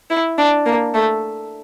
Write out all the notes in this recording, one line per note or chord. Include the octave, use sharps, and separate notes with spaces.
E4
D4
A#3
A3